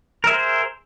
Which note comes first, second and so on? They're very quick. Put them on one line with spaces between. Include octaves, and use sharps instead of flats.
A#4 E5 G#4 C5